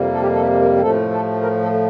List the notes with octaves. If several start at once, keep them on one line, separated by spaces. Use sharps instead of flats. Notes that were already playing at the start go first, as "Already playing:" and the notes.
Already playing: F2 C3 G3 A#3
A4
G4
A4
G4
A#4
G4
A2 F3 A3 A4
A4
A#4
A4